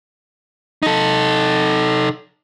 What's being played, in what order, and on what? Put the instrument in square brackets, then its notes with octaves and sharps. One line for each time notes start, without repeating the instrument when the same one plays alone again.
[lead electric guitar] D#4 A4